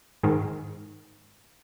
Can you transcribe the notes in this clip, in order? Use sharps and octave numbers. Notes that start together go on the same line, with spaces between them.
G#2 D#3